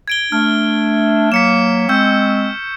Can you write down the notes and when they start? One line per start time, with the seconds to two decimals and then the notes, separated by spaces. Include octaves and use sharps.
0.08 G#6 D7 G7
0.32 A3 D4 F6
1.32 F#3 A#3 B6 C#7 E7
1.89 G#3 C4 C#6 E6 G6